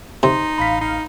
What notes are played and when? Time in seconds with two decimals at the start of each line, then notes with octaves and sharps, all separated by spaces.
0.23 C3 D#4 C6
0.58 A1 F5 B5 B6
0.81 D#4